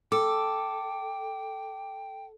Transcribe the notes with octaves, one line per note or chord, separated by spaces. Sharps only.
A4 G5 D6